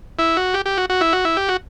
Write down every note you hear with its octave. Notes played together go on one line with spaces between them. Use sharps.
E4
F#4
G4
G4
F#4
F#4
E4
F#4
E4
G4
F#4